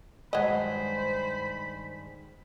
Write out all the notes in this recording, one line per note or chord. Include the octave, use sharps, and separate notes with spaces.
G2 D#3 F#3 G#3 C5 D#5 B5